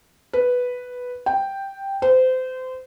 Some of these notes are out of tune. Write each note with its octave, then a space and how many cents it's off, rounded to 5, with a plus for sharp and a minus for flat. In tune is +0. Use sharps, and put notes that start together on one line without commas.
B4 +0
G5 +0
C5 -30